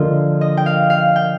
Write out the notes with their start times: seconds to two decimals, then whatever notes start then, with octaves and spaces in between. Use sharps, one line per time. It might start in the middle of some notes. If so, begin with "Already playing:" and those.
Already playing: D3 F3 A#3 F4 D#5
0.41 D#5
0.57 G5
0.66 F5
0.90 F5
1.16 G5